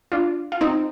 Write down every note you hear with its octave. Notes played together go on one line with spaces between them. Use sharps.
D4 F4
F4
C4 D#4